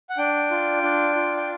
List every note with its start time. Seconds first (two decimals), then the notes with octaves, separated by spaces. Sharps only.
0.10 F#5
0.18 D4 G5
0.51 F4
0.83 D4
1.16 F4
1.37 G5